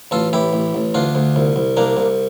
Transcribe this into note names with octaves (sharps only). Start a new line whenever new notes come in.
A1 F4 A4
A1 E4 G4
A1
A1
D2 D4 F4
D2
C2
C2
C2 A#3 D4
C2